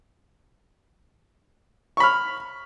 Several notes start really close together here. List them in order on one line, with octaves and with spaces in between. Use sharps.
C#6 B5 F6